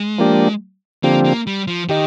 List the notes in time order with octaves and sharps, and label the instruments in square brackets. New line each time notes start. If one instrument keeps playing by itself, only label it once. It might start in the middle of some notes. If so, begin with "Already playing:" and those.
Already playing: [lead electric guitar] G#3
[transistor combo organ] F3 A#3 D4 G4
[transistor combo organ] D3 F3 C4 G4 [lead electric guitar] A#3
[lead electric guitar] A#3
G3
F3
[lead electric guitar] D#3 [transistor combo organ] D#4 G4